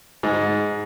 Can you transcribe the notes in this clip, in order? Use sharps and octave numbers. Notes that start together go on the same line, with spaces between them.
G#2